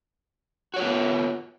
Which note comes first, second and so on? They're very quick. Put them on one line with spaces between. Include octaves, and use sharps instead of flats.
F#4 C#5 F4 B3